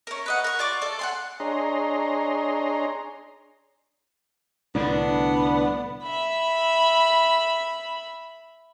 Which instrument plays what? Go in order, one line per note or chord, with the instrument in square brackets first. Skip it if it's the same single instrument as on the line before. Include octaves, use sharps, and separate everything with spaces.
[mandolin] C#4 A#4
B4 D#5 F#5
A#4 C#6
F4 D5 C#6 D6
A4 D5
F#5 G#5 C6
[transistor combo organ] D4 G#4 C#5 D#5 A#5 C6
[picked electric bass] C2 A2 D3 [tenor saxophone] B3 [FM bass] D4
[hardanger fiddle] E5 B5